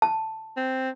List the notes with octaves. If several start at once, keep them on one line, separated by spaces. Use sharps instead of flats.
A5
C4